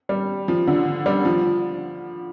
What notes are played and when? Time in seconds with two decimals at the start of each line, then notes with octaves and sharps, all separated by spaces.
0.09 G3
0.48 F3
0.67 D3
1.06 G3
1.25 F3